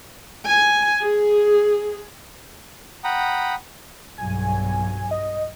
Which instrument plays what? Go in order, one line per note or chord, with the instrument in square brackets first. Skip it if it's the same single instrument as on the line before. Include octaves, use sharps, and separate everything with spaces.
[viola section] G#5
G#4
[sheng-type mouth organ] F#5 G5 A#5 B5 D#6
[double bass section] B1 G2 F#3 [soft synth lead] G#5
[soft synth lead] D#5